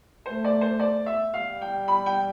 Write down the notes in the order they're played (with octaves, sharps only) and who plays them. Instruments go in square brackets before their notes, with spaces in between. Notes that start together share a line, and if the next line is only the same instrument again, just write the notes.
[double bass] A3 [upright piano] C5
[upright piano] D5
C5
D5
E5
[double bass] G3 [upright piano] F5
[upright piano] G5
B5
G5